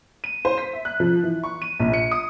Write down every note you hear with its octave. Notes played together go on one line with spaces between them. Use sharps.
D#7
C5
B6
E5
F#6
F3
E3
C#6
D#7
A#1
C#7
D#6